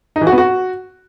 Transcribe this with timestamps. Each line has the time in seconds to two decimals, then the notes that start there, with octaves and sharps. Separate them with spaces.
0.16 D#4
0.21 E3
0.27 F#4
0.32 B3
0.38 F#4